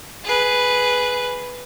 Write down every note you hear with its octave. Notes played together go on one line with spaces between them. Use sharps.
G#4 B4